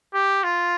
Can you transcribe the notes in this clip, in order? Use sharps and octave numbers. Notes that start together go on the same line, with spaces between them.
G4
F4